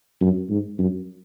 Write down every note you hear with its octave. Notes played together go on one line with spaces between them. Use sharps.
F#2
G#2
F#2